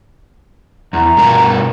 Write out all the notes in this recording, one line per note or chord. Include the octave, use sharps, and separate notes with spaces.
E2 A#5
G2 B2 A#4